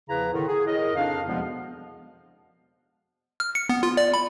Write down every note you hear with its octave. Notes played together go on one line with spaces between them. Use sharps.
E2 C#3 F3 E4 B4 A#5
A2 D3 D#3
G#4
A2 A#4 D#5
F2 C#3 D4 D#4 F5
E2 B2 F3 G3 G#3 B3
F6
C#7
B3
F4
D5
B5